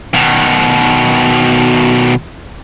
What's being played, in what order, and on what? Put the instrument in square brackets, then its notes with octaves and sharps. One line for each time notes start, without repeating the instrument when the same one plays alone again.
[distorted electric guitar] B2 D#3